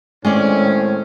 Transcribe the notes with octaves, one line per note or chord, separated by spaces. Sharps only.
A2 D#3 G#3 C4 C#4 C#5 D5